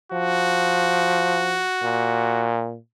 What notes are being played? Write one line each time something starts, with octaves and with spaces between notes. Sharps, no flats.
F3 F#4
A#2